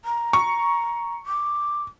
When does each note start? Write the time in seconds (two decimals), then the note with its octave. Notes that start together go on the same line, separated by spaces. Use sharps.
0.05 A#5
0.33 C#6
1.26 D6